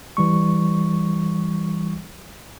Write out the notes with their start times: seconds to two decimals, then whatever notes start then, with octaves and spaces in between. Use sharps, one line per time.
0.17 E3 G3 C#6